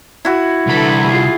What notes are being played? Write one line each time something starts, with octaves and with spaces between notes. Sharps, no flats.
E4 F#4
C2 D3 E3 A4 B5
F4 G#4